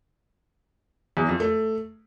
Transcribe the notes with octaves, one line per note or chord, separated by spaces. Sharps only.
E2
F2
A3